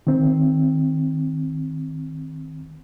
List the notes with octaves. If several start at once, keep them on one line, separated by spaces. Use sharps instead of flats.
D#3 C4